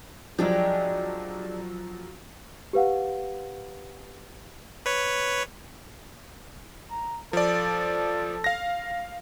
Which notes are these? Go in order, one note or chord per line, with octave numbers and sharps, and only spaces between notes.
F3 F#3 G#3 D4 G4
G4 B4 F5 F#5
B4 C#5
A#5
F3 A4 D5
F5 A#6